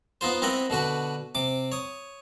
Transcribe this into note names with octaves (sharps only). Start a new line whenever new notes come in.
B3 D#4 F4 C5
C4 E4 A#4 D#5 E5 F#5
B2 D3 F#4 B4
C3 D6
C#5 D#6